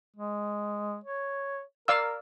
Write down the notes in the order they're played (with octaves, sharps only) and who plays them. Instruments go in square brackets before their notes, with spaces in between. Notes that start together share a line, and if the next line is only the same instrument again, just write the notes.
[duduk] G#3
C#5
[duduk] A#4 [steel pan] D5 F5 E6